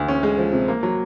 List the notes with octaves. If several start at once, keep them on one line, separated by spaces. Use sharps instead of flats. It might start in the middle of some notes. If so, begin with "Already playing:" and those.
Already playing: D2
C#4
G#3
F3
C3
A#3
F#3